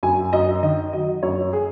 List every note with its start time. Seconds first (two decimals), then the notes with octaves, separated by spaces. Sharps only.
0.03 F#2 G#5
0.33 F#2 D#5
0.63 D#3 D#5
0.93 F#3 D#5
1.23 F#2 C#5
1.53 G#4